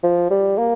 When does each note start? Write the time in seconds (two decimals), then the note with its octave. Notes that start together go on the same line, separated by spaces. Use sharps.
0.03 F3
0.30 G3
0.58 A#3